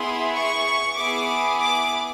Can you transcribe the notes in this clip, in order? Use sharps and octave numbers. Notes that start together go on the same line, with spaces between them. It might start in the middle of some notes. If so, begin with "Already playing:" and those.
Already playing: B3 E4 G#4 C6
C#6
B3 E4 G#4 D6
D6